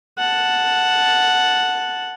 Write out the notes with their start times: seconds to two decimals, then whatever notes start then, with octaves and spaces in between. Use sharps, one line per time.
0.18 F#5 A5